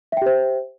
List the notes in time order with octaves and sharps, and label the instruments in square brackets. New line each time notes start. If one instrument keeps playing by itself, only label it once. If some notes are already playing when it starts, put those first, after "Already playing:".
[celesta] E5
G5
G4
C5